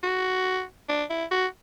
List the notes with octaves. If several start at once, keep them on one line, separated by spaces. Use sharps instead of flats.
F#4
D4
E4
F#4